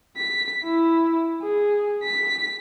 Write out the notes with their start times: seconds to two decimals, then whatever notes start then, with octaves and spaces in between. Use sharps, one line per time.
0.17 B6
0.65 E4
1.43 G#4
2.03 B6